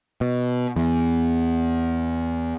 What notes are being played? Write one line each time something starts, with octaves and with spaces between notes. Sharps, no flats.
B2
E2